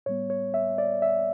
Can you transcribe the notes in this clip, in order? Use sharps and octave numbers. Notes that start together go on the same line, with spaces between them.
A2 G3 B3 C#5
C#5
E5
D5
E5